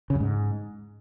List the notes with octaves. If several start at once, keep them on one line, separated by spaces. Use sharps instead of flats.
C#3
F#2
G#2